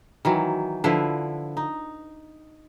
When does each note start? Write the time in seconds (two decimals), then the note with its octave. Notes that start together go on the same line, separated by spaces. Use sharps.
0.25 D#3 E3 F#3
0.84 D3 F3 E4 B4
1.57 D#4